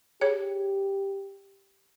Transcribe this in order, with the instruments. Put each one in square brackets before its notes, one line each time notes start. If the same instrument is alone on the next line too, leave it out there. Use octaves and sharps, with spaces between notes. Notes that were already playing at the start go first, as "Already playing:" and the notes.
[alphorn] G4 [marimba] G#4 C#5